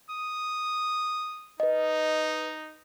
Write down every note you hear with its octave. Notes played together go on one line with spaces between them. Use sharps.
D#6
D#4 B4 D#5